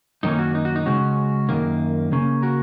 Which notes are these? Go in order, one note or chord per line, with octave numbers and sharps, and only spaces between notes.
F#2 D#3 A#3 C#4 D#4
F#4
D#4
F#4
D#4
C#3 G#3 C#4 F#4
F#2 D#3 A#3
C#3 A#3 C#4
F#4 A#4